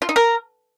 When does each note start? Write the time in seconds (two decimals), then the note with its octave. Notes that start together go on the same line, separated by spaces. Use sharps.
0.02 F4
0.09 D#4
0.16 A#4